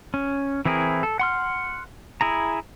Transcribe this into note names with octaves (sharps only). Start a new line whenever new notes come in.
C#4
E3 C4 E4 G#4 A#4
A4
F#5 C6 F6
E4 G#4 A#5